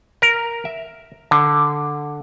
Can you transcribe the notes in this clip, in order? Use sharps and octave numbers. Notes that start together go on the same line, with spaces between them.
A#4
E5
D3